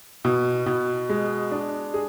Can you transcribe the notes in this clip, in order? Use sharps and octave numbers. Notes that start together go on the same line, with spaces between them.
B2
B2
G#3
D4
G#4